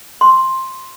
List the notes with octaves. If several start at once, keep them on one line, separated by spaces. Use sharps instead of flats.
C6